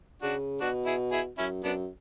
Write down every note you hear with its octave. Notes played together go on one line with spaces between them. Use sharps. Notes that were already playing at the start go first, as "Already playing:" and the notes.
C#3 D4 F#4
B2 D4 F#4
E4 G#4
E4 G#4
F#2 C#4 E4
F#2 B3 D4